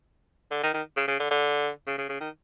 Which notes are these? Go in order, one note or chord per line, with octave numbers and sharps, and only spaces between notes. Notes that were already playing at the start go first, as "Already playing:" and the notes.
D3
D#3
D#3
C#3
C#3
D3
D3
C#3
C#3
C#3
D#3